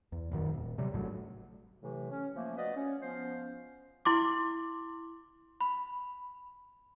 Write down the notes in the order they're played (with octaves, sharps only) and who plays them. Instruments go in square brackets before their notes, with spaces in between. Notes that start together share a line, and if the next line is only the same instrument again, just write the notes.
[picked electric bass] E2
D#1 F#2 D#3
D#1
C3 F#3 G3
G#1 A2 F#3
[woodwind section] A2 C3 E3 F#3 A3
C#4
F3 A3 A#3
F#4 B4 D5 D#5
C#4
F3 B3 C#4 C5 F5
[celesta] E4 C6 D6
B5